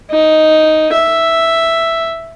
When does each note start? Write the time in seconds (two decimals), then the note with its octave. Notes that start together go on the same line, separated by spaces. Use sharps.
0.11 D#4
0.92 E5